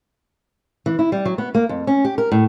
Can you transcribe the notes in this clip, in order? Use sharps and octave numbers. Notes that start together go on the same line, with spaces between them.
E3
E4
G3
F#3
B3
A#3
F2
C#4
G4
A#4
A2